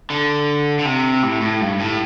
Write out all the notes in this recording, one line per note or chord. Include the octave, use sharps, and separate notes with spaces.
D3
D3
C3
A2
A2
G2
A2